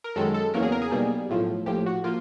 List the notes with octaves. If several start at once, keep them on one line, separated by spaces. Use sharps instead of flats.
A#4
F#2 D#3 G#3 A4
A4
E2 C#3 F#3 A#3 A#4
G#4
A#4
G#4
B1 B2 G3 A#3
B1 A2 F3
A#1 A2 F3 G4
F#4
F3 A#3 F4